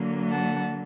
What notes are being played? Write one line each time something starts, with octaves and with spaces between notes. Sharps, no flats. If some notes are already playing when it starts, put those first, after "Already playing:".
Already playing: D3 F#3 A#3
F#5 A5